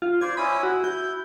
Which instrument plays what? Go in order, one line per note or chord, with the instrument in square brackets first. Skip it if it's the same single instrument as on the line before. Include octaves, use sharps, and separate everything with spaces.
[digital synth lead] F4
[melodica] C5 D5 [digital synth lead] G#6
[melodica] C#4 E4 D#6 [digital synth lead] B5
[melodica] E4 [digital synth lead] F#4
[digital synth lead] G6